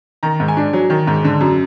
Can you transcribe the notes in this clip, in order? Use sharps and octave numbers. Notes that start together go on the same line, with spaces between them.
D#3 A#5
G#2
G#5
D4
F#3
D#3
G#2
D3
F#2